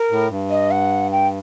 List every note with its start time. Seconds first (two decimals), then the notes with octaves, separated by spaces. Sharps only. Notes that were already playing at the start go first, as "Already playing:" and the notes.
Already playing: A#4
0.11 A2
0.30 G2
0.50 D#5
0.71 F#5
1.12 G5